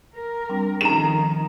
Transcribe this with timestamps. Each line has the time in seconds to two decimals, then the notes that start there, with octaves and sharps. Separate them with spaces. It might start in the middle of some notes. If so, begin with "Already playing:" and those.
0.15 A#4
0.49 G3 C4 D4
0.81 D#3 F3 C#4 A#5 E7